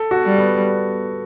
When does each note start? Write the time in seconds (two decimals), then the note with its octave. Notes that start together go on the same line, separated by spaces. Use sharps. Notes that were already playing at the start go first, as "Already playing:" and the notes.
Already playing: A4
0.11 F#4
0.25 G3
0.38 B3